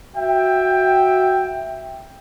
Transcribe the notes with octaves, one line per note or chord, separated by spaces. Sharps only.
F#4 E5 G5